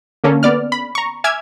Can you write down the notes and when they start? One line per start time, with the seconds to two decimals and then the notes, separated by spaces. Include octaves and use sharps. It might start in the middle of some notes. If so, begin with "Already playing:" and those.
0.24 D3 A#3 C#4 A4
0.43 B3 D5 F6
0.72 B5
0.95 A#5 C#6
1.24 E5 G#5 D6 E6 F6 G#6